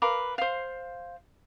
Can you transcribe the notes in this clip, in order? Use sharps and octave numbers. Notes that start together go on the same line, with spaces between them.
A#4 B4 F5 D6
C5 F5